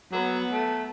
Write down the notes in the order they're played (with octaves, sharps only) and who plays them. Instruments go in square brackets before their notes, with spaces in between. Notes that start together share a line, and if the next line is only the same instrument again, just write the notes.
[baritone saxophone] F#3 [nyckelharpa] B3 B4
[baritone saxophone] A3